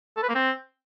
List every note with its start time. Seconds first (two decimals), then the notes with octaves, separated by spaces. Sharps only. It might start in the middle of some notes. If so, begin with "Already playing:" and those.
0.17 A4
0.23 B4
0.29 A#3
0.35 C4